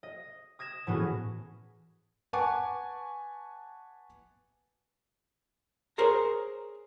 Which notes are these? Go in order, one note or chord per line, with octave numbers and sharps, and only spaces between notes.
D#5
D#6 G#6 A#6 E7
A2 E3 B3 C#4 F#4 G#4
B4 F#5 G#5 A5 C#6 D6
G#4 A#4 C5 C#5 A#5